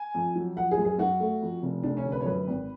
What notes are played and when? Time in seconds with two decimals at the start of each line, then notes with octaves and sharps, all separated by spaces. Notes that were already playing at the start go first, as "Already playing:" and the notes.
Already playing: G#5
0.15 F2
0.36 F#3
0.56 F3 F#5
0.71 G#4
0.78 F#2
0.85 G#4
0.98 F#2 F#4
1.20 A3
1.42 F2
1.62 F1
1.83 F1 D4
1.97 C#4
2.05 D3
2.12 B4
2.21 C#5
2.26 F#2 B4
2.47 G#1